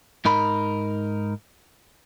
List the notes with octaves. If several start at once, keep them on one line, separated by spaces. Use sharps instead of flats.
G#2 D#4 A#4 B5